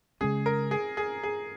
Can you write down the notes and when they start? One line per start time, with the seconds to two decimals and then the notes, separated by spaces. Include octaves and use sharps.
0.21 C#3 G#3 C#4 G#4
0.46 A#4
0.71 G#4
0.97 G#4
1.23 G#4